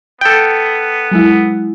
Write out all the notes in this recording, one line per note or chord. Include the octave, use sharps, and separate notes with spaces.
B3 A4 G5
F#3 G#3 E4